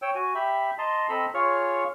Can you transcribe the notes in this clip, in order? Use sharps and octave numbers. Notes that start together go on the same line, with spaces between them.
C#5 G5 E6
F#4 G#5
G4 E5 B5
D#5 A5 A#5 C6
C4 A4 D#5 A#5 B5 E6
F4 G#4 C#5 C#6 F6